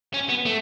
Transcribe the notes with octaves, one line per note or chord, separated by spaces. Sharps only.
C#4
B3
A3